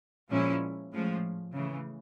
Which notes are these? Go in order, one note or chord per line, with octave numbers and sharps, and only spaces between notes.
A#2 F3 G#3 C#4 E4
A2 F3 G#3 C#4
C#3 E3 A3